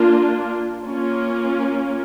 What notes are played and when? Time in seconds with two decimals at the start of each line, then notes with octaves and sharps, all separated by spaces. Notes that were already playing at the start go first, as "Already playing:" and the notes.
Already playing: A#3 D4 F4
0.84 A#3 C#4 F4